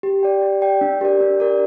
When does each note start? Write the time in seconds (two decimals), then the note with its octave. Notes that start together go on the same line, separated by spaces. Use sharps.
0.03 G4
0.23 D5 G5
0.42 G4
0.62 D5 G5
0.81 D4
1.01 G4 A#4 D5
1.21 D4
1.40 G4 A#4 D5